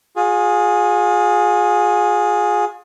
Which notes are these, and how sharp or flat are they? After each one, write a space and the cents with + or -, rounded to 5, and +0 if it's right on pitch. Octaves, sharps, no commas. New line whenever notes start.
F4 +40 G#4 +0